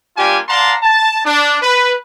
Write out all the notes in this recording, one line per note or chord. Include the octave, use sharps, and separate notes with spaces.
G3 A#3 D4 F4 G4 G#5
D5 F5 F#5 A5 A#5 C6
A5
D4
B4